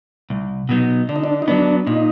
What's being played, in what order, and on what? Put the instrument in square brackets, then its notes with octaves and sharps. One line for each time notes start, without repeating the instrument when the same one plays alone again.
[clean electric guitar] C2
B2 F#3 B3 D#4
[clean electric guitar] D3 [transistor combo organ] D4
[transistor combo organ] D#4
D4
D#4
[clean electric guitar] F#3 B3 [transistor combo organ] D4
[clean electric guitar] A#2 [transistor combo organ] D#4